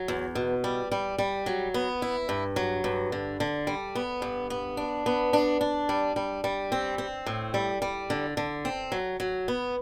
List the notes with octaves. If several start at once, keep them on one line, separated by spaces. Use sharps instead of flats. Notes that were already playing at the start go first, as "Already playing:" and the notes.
Already playing: F#3
E2
B2
G3
G3
G3
F#3
B3
E4
G2
F#3
G2
D3
D3
G3
B3
G2
B3
D4
B3
D4
D4
G3
G3
G3
C4
C4
A2
G3
G3
D3
D3
C4
F#3
F#3
B3